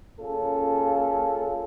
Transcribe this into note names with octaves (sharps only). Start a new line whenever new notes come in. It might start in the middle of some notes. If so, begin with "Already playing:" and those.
C#3 A#3 C#4 F4 A4